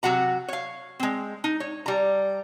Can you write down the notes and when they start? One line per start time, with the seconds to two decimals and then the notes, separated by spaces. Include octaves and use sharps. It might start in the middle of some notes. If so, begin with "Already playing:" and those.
0.03 C3 F#3 F#4 F#5 A#5
0.48 C#5 F5
1.00 G#3 C4
1.44 D#4
1.60 C#5
1.86 G3 A#5